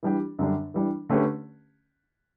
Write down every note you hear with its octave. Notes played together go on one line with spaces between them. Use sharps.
E3 G3 D4 G4
F#2 D3 G3 D4
E3 G3 D4
D3 A3 C#4 G4 B4